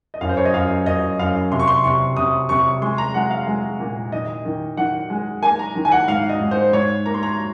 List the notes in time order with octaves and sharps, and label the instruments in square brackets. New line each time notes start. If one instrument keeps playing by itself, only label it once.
[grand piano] D#5
F#2 F5
C5
C#5
D#5
F#2 F5
F#2 D#5
F#2 F5
C3 C6
C#6
C6
C3 C#6
C3 D#6
C3 C#6
G#3 C6
A#5
G#3 F#5
F5
G#3
A#2
D#3 D#5
D#3
D#3 F#5
G#3
A#3 G#5
A#5
D#3
G#5
F#5
G#2 F5
D#5
G#2
C5
G#2 C#5
A#3 A#5
C6
A#5